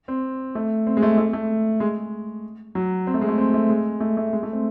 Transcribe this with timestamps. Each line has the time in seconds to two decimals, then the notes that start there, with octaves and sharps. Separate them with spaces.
0.08 C4
0.55 A3
0.87 C4
0.97 G#3
1.02 A3
1.18 A3
1.33 A3
1.80 G#3
2.75 F#3
3.07 C4
3.14 A3
3.21 G#3
3.28 A3
3.38 C4
3.54 A3
3.69 G#3
4.00 A3
4.17 A3
4.33 G#3
4.43 A3
4.53 C4